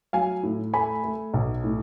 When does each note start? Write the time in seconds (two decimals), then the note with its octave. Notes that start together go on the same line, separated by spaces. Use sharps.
0.13 F#3 F5 G#5
0.43 A2
0.74 A3 G#5 B5
1.04 A3
1.34 B1
1.64 A2